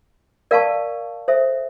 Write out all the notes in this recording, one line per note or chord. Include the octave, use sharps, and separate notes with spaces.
A#4 D5 F5 A5 C#6
A4 C5 E5